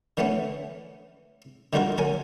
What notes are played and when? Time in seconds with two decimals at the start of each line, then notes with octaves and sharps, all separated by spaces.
0.17 D3 E3 A3 B3 C#4
1.73 D3 D#3 G3 F4 F#4 A#4
1.98 F#3 A#4 G#5